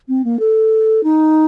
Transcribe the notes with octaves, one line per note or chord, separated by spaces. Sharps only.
C4
A#3
A4
D#4